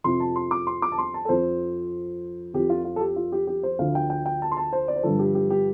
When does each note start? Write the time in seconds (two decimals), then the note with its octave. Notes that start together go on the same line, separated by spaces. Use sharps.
0.04 F2 C3 F3 C6
0.20 A5
0.36 C6
0.51 D6
0.67 C6
0.82 D6
0.92 A5
0.98 C6
1.14 A5
1.25 A4
1.29 F2 F3 C5
2.54 F2 F3 G4
2.70 F4
2.85 F4
2.96 A4
3.00 G4
3.16 F4
3.32 G4
3.47 G4
3.63 C5
3.79 D2 D3 F3 F5
3.95 G5
4.10 G5
4.26 G5
4.42 A5
4.52 C6
4.57 A5
4.73 C5
4.88 D5
4.96 C5
5.03 G2 D3 F3 A4
5.19 G4
5.35 G4
5.50 G4